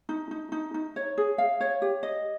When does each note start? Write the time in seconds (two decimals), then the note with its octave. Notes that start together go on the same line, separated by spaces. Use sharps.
0.09 D#4
0.31 D#4
0.52 D#4
0.74 D#4
0.96 C#5
1.18 G#4
1.38 F5
1.61 C#5
1.82 G4
2.03 D#5